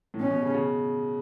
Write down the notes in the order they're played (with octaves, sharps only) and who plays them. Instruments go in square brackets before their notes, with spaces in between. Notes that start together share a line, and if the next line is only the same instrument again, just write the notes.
[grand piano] A2
[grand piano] B2 [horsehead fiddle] C#4
[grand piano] B2
C#3
C#3